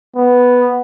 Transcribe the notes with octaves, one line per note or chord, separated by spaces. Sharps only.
B3